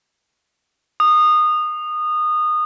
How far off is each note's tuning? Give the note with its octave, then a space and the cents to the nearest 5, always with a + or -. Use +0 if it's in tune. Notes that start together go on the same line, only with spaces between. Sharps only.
D#6 -20